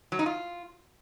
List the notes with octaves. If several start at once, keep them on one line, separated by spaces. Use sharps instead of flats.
F#3
D#4
F4